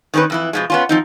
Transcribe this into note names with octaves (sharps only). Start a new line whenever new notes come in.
D#3 C4 C#4 D#4 B4
F2 E3 E4
B2 F3 G#3
B3 C#4 F4
F3 C4 D#4